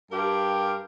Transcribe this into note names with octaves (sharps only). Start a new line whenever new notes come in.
G2 G4 A#4 F5